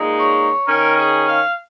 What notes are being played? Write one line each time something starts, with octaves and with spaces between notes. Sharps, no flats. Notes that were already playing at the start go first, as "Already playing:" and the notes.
Already playing: A#2 G#3 D#4
C#5
D#3 C#4 A#4
G#4
F5